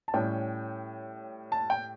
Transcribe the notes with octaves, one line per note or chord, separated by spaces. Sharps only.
A5
A2 G3 C#4 G5
A5
G5